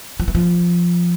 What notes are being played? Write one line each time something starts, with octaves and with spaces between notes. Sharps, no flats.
F3
E3
F3